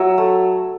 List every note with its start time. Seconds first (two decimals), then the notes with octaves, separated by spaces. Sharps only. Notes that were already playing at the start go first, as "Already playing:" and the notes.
Already playing: F#3 E5
0.18 A3